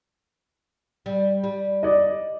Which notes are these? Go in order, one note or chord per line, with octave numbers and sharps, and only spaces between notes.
G3
G3
D5 D#5